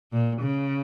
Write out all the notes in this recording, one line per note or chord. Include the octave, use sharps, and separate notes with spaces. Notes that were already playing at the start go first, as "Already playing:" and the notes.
A#2
C#3